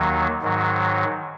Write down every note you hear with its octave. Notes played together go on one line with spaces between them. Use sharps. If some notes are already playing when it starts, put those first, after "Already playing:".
Already playing: D#2 D#3 F#3
G#2 D#3 F#3